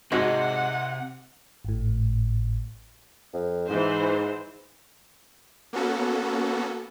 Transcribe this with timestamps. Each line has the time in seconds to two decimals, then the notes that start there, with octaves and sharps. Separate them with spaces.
0.12 G#1 C3 G#3 F#4 F#5
1.65 G#1 A2
3.33 F2
3.69 G#2 E3 C5
5.73 A#3 B3 C#4 F#4 A4